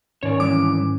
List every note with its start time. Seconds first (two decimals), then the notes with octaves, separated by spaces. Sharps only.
0.23 G#2 D#3 C#4 C#5 D5
0.40 G2 E3 D6